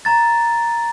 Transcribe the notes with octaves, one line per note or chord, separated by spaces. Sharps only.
A#5 A6